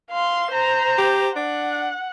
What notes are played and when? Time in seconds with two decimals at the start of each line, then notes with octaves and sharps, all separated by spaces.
0.11 F5 C6
0.51 C5 A#5
0.98 G4
1.36 D4 F#5